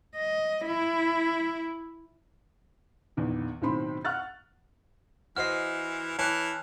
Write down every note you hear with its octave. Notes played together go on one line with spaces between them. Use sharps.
D#5
E4
A#1 E2 D#3
B1 A2 D#3 C4 B5 C6
F#5 C#6 F6 F#6 A6
E3 F#4 C5 D#5 F6 C7
E3 C#5 A5 F#6